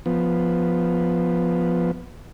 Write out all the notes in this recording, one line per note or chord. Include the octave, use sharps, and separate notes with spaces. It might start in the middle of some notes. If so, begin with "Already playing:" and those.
F3 B3